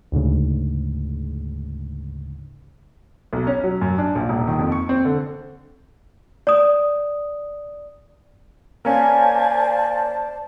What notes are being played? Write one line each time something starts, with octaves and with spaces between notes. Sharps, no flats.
D2 G#2 C#3
B1
C#4
F#3
F#2
D4
A#1
D#1
D#3
F2
C#6
C4
D3
D5 D#6
A#3 C#4 C5 D5 G#5 A5